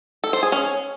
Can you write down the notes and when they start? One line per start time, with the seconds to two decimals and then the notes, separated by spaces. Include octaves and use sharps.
0.24 A4
0.33 C5
0.43 G#4
0.52 C#4